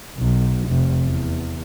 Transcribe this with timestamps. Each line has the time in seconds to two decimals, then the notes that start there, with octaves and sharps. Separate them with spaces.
0.18 B1
0.68 F1
1.04 E2